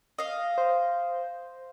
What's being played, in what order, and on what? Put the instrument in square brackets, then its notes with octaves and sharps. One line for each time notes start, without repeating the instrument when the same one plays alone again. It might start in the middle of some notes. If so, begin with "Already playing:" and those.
[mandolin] D#5 F5
[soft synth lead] C5